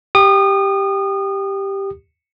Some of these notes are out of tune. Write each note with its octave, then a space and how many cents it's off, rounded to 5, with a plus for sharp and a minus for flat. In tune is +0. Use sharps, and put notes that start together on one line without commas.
G4 +0 D#6 -30